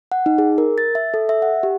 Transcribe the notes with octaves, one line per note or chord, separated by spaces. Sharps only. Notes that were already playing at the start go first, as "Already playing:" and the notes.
F#5
D#4
G#4
A#4
A6
E5
A4
E5
F#5
G4